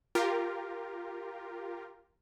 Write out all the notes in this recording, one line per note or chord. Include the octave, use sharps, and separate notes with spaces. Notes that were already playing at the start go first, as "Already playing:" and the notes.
F4 G4 A#4